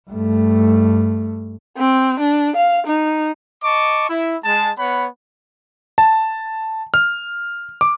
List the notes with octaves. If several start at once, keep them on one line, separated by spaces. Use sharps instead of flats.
G2 A3
C4
D4
F5
D#4
D#5 A5 C#6 D6
E4
G#3 A5
B3 C#5 F#5 B5
A5
F6
D6